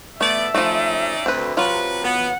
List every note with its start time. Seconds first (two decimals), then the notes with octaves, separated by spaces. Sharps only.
0.21 A3 B3 D5 E5
0.54 F3 A3 C#4 D#4 D5
1.26 D2 C4 B4
1.57 C3 F#3 F4 B4
2.04 B3 F#5